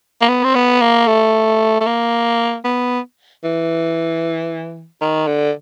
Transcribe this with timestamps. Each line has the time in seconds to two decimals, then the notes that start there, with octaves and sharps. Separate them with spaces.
0.21 A#3
0.29 B3
0.44 C4
0.55 B3
0.81 A#3
1.07 A3
1.80 A3
1.86 A#3
2.64 B3
3.44 E3
5.01 D#3
5.27 D3